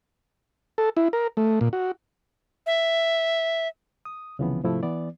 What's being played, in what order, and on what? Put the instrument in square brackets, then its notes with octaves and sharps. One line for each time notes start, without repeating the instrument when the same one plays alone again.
[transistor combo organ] A4
E4
A#4
A3
A#2
F#4
[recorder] E5
[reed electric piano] D#6
C2 C#3 E3 F3 B3
G#2 C3 F3 A3 E4
E3 B3 D5